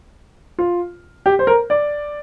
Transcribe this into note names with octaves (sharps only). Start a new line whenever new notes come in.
F4
G4
C5
A#4
D5